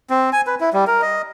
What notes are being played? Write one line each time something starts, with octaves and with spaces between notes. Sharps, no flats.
C4
G#5
B4
E4
G3
A#4
D#5